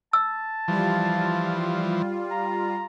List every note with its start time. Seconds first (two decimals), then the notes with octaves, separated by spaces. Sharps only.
0.13 A5 E6
0.68 E3 F3 G3 F4
2.31 A#5